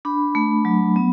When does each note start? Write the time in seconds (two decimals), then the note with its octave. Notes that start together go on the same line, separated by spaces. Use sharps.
0.05 D4 B5
0.35 A3
0.65 F#3
0.96 B3